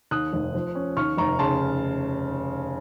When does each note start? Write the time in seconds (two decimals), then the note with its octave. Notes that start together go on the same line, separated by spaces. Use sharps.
0.11 D#2 D#6 F#6
0.33 F1
0.55 F3
0.75 C#4
0.97 D#2 C#6 F6
1.18 F1 A#5 C#6
1.39 C#3 A5 C6